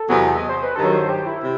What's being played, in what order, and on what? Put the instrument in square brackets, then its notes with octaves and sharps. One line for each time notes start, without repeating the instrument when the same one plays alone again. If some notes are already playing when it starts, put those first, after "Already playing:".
Already playing: [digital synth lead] A4
[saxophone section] E2 C3 F#3 B3
[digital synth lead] D#5
C5
B4
[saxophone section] G2 D#3 F#3 [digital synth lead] A4
[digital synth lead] C5
G4
E4
[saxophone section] C3